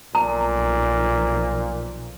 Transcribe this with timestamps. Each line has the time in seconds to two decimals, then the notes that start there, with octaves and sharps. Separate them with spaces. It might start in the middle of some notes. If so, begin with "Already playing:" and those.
0.15 B1 A#2 F3 A#5